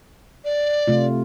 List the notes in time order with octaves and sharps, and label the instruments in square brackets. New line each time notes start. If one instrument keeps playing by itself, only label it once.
[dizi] D5
[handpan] C3 A3 F4